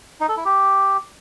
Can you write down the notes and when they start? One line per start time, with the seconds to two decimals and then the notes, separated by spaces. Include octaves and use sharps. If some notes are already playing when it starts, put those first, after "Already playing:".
0.21 D#4
0.29 A4
0.37 E4
0.45 G4